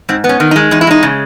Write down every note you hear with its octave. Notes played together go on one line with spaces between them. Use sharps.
G#2 C4
B3
C#4
D#3
D#4
G#3
E2 D#4
E4
G#3 D#4
C#3